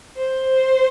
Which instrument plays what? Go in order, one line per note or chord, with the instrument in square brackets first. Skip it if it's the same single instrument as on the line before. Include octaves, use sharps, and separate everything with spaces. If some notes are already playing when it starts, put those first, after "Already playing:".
[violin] C5